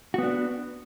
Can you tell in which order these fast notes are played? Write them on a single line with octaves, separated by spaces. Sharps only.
F#4 B3 D4